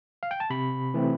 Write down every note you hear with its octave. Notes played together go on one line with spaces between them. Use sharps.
F5
G5
A5
C3 B5
E3 A3 C4